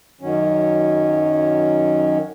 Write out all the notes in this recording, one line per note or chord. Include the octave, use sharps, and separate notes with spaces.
F#2 D#3 F#3 C#4